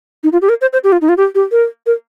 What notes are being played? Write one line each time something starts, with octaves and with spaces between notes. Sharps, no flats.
D#4
F4
G4
A#4
C5
C5
G4
F4
D#4
F4
G4
G4
A#4
A#4